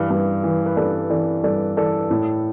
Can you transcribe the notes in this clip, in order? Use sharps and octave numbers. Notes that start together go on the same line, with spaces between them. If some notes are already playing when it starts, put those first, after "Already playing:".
Already playing: G2 E3
G2
E3
B4
G2 A4 D5
E3 A4 D5
G2 A4 D5
E3 A4 D5
A2